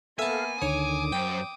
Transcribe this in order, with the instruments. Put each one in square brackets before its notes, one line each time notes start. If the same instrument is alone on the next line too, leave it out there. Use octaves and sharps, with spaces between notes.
[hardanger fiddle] A#3 B3 [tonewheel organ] A4 F5 [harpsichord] E5 A5 [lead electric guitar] G#5
[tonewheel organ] D2 D3 D#3 [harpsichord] C#5 [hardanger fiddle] D6 D#6
[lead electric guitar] F#2 [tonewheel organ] C5 [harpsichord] G5